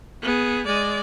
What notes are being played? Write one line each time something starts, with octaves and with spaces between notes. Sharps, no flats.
B3 G#4
G#3 D5